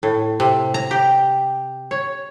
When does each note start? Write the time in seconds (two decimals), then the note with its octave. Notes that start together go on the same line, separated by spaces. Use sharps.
0.03 A2
0.40 C3
0.74 A#5
0.91 G4
1.91 C#5